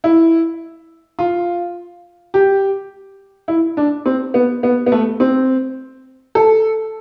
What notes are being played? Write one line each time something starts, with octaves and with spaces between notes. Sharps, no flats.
E4
F4
G4
E4
D4
C4
B3
B3
B3
A3
C4
A4